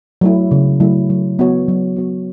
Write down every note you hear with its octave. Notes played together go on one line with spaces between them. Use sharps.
F#3 A3 E4
C#3
F#3 A3 E4
F#3
B3 F#4 C#5
F#3
B3 F#4 C#5